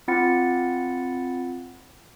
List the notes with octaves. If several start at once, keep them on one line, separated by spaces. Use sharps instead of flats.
C4 F4 F#5 B5 A6 C#7